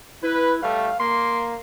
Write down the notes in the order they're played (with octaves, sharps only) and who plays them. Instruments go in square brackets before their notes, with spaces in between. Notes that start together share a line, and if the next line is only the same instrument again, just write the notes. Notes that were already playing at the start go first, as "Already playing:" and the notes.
[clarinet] E4 [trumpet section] B4
[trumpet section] G3 A3 [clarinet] F5
[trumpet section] A#3 [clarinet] C6